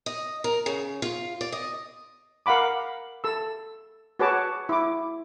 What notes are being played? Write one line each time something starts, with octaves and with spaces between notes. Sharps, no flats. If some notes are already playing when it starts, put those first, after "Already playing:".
D#5
A#4
C#3
F4
D5
D#5
A#4 F5 F#5 B5 D6
A4 E6
F#4 G#4 B4 C#5 A5 D6
E4 D6